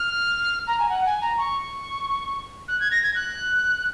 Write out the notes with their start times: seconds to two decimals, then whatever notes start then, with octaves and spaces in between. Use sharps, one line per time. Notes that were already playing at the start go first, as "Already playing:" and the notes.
Already playing: F6
0.67 A#5
0.79 G#5
0.89 F#5
1.06 G#5
1.21 A#5
1.38 C#6
2.68 F#6
2.80 G#6
2.91 A#6
3.03 G#6
3.15 F#6